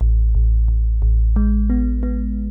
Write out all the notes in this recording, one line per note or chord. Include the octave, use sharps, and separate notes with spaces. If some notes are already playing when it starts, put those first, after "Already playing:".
A1
A1
A1
A1
G#3
B3
B3